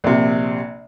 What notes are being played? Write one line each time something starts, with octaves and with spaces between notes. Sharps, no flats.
A#1 C3